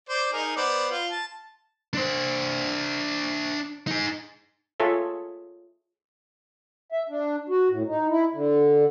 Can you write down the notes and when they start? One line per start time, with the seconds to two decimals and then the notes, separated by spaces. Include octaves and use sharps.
0.09 C5 D5
0.33 D#4 G#4 A#4
0.56 B3 C5 D5
0.91 F4
1.11 A5
1.94 D4 C5
3.87 D#4 G#4
4.80 F4 G#4 A4 C#5 E5
6.92 E5
7.09 D4
7.49 F#4
7.70 A2
7.87 D#4
8.10 E4
8.33 D3